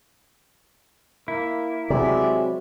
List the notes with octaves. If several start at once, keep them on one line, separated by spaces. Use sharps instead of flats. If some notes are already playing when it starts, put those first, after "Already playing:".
A#3 E4
C3 F#3 G#3 G4 D5 E5